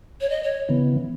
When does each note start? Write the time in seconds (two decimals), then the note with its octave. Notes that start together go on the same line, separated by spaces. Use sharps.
0.21 C#5
0.30 D#5
0.43 C#5
0.69 C#3 E3 B3